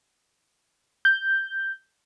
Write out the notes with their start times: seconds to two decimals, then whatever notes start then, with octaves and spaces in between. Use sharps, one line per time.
1.05 G6